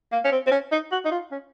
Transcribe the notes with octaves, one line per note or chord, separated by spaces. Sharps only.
A#3
C#4
C4
C4
C#4
D#4
F#4
D#4
F4
C#4